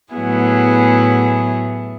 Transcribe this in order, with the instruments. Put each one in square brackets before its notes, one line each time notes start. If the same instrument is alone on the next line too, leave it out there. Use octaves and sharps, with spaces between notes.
[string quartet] A2 F#3 B3 E4 G#4